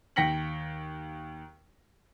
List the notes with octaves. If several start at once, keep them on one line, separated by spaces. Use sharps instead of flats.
D#2 G5 A#6 B6 C#7 F#7